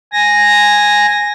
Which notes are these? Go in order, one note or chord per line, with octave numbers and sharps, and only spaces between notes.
G#5 A#6